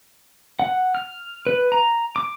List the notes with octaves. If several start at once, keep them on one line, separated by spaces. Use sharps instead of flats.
F#5
F6
B4
A#5
D6